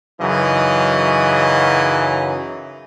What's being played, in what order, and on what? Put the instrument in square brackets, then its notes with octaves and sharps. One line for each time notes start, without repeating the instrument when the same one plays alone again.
[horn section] F#2 C#3 E3 F#3 D#4 D#5